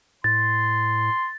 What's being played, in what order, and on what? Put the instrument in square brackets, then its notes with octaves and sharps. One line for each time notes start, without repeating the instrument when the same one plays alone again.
[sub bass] A2 [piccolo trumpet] C6 [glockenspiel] A6